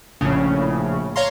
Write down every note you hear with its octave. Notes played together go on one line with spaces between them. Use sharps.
A#1 A2 C#3
C#5 F5 A#5 C6